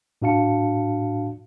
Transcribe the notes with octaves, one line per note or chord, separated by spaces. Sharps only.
A2 D4 F#4 F5 A5 C#7